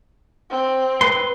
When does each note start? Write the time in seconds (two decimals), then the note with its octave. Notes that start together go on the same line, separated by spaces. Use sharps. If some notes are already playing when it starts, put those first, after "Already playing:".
0.50 C4
1.01 B4 C6